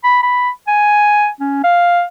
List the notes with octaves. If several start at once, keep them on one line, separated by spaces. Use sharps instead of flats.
B5
B5
G#5
C#4
F5